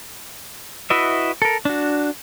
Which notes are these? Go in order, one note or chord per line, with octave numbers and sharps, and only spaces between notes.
E4 F#4 B4 D#5 E5
A4 A#4
D4 F#4